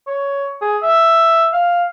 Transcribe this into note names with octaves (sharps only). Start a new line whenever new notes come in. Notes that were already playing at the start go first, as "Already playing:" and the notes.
C#5
G#4
E5
F5